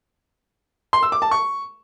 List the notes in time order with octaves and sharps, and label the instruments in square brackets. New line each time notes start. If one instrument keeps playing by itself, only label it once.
[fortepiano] C6
E6
D6
A5
C#6